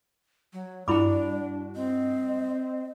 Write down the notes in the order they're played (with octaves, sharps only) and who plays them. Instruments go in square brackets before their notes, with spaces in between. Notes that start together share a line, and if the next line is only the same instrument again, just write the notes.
[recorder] F#3
[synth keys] G2 F#4 [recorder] D4 [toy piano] E4 B5 D6 [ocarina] D5
[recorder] C4 [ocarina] D#5